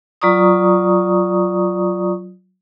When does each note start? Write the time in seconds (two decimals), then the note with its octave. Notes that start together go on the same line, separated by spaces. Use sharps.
0.22 F#3 F4 D5 A#5 C#6 D#6